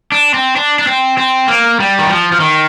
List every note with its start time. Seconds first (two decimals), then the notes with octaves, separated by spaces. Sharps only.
0.12 D4
0.34 C4
0.56 D4
0.79 D4
0.87 C4
1.18 C4
1.48 A#3
1.80 G3
1.99 D#3
2.09 F3
2.32 F3
2.40 D#3